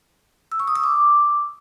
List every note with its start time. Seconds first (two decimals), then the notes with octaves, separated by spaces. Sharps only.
0.52 E6
0.60 C#6
0.68 D#6
0.76 E6
0.84 D6